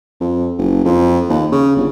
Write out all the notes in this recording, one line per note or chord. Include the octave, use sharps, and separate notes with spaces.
F2
F#1
F2
D#2
C#3
G1